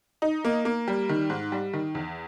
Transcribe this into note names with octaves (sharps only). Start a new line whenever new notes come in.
D#4
A#3
A#3
G3
D#3
G#2
G3
D#3
E2